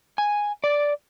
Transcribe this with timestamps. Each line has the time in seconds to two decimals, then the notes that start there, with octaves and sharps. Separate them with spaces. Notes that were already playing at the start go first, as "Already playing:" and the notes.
0.18 G#5
0.64 D5